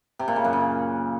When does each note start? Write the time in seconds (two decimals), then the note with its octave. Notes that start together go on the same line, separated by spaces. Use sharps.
0.19 C3
0.28 A#2
0.36 C#3
0.44 F#2
0.53 C#3